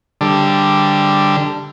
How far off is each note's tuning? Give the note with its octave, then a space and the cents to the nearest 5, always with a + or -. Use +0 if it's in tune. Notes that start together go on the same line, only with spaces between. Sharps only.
D3 +0 G3 +0